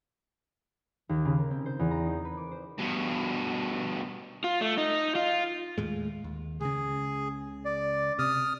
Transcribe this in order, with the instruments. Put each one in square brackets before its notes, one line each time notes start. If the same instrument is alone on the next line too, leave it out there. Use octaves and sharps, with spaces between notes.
[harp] D#2
C#3
A#4
C4
C5
E2
A#5
D#4
B4
D6
C5
[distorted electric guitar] G2 B2
[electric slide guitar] F4
A3
D#4
F4
[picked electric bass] D#2 A2 G#3
D#2
[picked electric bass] C#2 C#3 [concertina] G#4
[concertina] D5
[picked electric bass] C3 [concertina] D#6 F6